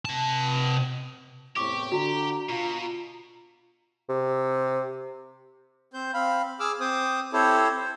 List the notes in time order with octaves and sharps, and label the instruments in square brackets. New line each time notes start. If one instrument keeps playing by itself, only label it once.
[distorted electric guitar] C3 A5
[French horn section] E2 A2 C3 [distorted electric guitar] G4 [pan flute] C#6 [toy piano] D6
[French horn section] D3 [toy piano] F#4 [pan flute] A#5
[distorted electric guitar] B2 [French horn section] F4
[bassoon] C3
[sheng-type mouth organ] C4 C5 G6
C4 F5 B5
G#4 D6 E6 F6
C4 C5 D6 D#6
C4 E4 G4 A4 C5 C#5
C5